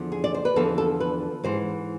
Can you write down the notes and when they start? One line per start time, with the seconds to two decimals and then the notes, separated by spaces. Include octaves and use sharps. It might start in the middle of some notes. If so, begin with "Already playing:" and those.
Already playing: E2 D3 F3
0.12 G#4
0.24 D5
0.34 C5
0.45 B4
0.56 E2 D3 F3 A4
0.78 A4
1.00 B4
1.43 G#2 E3 C5